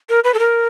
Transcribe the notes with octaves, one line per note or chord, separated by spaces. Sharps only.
A#4
B4
A4
A#4